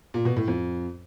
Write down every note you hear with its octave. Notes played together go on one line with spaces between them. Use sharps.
A#2
B2
A2
F2